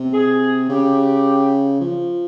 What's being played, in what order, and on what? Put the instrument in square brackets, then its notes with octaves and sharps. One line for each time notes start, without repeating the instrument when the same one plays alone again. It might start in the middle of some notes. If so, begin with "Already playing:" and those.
Already playing: [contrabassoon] C3
[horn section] G#4
[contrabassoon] C#3 [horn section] G4
[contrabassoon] F3